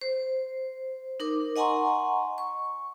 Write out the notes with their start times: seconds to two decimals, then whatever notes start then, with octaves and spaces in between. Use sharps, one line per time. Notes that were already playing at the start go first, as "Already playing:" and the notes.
0.01 C5
1.20 D#4 A#4 D6
1.56 D#5 F#5 G#5 A#5 C6 C#6
2.38 C#6